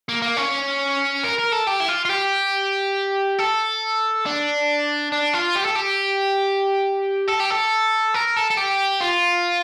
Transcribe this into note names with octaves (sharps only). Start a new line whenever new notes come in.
A#3
A#3
C#4
A#4
A#4
A4
G4
E4
F4
F4
G4
A4
D4
D4
F4
G4
A4
G4
A4
G4
A4
A#4
A4
A4
G4
F4